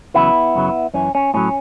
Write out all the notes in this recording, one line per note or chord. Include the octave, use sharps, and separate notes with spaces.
E2 C#3 F#3 B3 E4
F#2 C#3 F#3
F#2 E3 C#4
C#4
A2 F#3 C#4